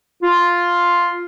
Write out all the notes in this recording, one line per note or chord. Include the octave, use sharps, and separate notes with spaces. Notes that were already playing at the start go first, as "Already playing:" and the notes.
F4